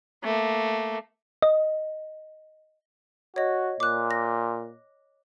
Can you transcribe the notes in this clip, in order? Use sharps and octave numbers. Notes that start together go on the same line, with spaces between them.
A3 A#3
D#5
F#4 C#5 D#5
A#2 D6 F#6
A#6